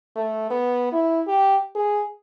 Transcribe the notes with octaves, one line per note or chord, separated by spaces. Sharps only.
A3
B3
E4
G4
G#4